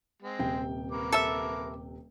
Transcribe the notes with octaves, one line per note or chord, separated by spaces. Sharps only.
G#3 C4
D#1 C3 G5
A#4 B4 D6
A4 E5